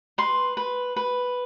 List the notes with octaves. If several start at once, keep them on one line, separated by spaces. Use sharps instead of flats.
B4 C6
B4
B4